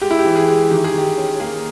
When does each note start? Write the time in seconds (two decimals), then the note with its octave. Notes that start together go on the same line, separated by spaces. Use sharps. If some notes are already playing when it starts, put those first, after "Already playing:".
0.01 G#3 G4
0.11 E4
0.19 G4
0.25 E3
0.36 G#4
0.48 G#3
0.71 D#3 G4
0.84 G#4
0.94 D#3 G4
1.17 C#4
1.40 A#3 G#4